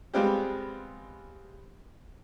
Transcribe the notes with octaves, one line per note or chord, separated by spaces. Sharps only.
G3 G#3 B3 C4 F4 G4